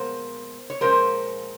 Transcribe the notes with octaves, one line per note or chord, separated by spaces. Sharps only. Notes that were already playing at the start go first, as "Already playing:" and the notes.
Already playing: A#2 F3 G#3 B3 A#4 C5
C#5
A#2 F3 G#3 C#4 A#4 C5